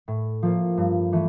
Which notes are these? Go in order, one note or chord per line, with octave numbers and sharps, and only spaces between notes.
A2
F3 A#3
G2
E3 A3